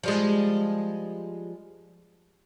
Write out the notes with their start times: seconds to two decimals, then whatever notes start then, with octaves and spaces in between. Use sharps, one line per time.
0.03 F3 G3 G#3